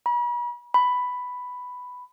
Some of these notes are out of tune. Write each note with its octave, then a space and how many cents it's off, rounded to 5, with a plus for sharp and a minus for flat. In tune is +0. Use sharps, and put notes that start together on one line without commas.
B5 -40
B5 +5